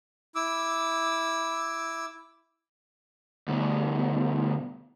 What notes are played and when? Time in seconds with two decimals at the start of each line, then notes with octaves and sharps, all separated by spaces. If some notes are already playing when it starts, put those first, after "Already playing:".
0.35 E4 D6 E6
3.48 D2 B2